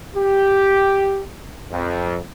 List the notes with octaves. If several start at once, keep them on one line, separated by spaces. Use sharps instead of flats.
G4
F2